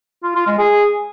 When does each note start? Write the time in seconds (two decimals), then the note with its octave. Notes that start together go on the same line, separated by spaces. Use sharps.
0.23 F4
0.35 F4
0.47 G#3
0.58 G#4